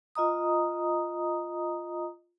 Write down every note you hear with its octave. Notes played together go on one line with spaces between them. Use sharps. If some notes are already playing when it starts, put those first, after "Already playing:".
F4 D#5 A#5 D#6